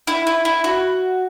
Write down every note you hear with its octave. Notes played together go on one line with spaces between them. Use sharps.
E4
E4
E4
F#4